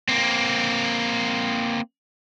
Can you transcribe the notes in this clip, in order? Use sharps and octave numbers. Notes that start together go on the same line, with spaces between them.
A#3 C4